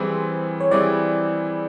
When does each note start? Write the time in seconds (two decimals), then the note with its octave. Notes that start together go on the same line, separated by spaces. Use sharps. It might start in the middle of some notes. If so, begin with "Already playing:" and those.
Already playing: E3 G3 C4 E4 G#4 C5
0.60 C#5
0.71 E3 G3 C4 E4 G#4 D5